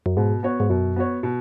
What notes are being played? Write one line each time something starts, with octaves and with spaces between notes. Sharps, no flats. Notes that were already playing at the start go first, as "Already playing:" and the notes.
F#2
G#2 B2
B3 F#4 C#5
G#2
F#2 B2
B3 F#4 C#5
B2